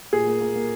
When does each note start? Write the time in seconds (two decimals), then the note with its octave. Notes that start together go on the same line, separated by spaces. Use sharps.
0.13 A#2 G#4
0.27 A#3
0.41 A#3
0.56 A#3